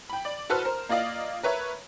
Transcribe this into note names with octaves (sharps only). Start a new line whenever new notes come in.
G5 B5
D5
F#4 A4 B4 C5 A5 F6
A#4 C5
A#3 F4 D5 D#5 F5
A#4 B4 C#5 E5